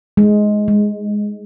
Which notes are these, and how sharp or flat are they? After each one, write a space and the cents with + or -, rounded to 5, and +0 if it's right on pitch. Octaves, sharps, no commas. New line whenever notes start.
G#3 +10
G#3 -10